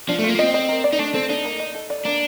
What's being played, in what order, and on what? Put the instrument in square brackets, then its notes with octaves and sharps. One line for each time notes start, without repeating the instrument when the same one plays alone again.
[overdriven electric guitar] F3 [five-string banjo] D4
[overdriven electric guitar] A3
[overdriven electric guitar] A#3 [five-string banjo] F4
[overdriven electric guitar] A#3
[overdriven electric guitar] C4 [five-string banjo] D#5
[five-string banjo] D#5
A#4
D5
[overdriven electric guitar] D#4
[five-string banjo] A3 [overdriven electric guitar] D4
[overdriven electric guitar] C4 [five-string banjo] A4
[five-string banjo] D4 [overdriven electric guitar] D#4
[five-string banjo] A#3
D#5
A4
D5
[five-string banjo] A#3 [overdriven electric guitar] D4